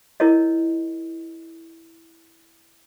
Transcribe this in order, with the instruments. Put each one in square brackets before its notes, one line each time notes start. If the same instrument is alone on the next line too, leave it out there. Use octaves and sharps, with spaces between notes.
[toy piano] E4 A#4 C#5 D#5